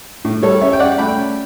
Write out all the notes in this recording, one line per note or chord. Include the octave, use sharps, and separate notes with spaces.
A2
G3 A4 C#5
C#4 C#5 E5
G5
C#4 D5 F#5
A3 G5 B5
C#4